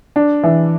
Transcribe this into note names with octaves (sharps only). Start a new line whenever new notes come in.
D4
E3